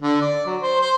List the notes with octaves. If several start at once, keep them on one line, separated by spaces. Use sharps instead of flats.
D3
D5
F#3
C5
C5